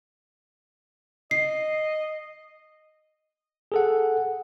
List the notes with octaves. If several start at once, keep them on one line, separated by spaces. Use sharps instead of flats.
D#5 C7
G#4 A4 F#5